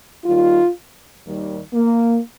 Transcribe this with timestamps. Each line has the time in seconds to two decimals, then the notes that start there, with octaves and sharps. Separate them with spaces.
0.25 D#2 D#3 G3 F4
1.24 D#2 D#3 G3
1.73 A#3